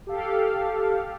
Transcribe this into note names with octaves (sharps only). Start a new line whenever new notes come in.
G4 A4 F5